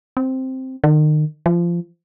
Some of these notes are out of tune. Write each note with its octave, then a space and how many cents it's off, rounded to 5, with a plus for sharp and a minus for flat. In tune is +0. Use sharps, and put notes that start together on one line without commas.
C4 +0
D#3 -35
F3 -20